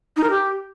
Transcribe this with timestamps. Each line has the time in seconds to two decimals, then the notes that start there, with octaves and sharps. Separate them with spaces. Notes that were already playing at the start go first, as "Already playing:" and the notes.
0.17 D#4
0.23 A#4
0.30 G4